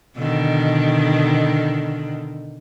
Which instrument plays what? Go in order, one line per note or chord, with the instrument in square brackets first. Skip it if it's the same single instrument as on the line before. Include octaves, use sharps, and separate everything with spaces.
[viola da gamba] B2 D3 D#3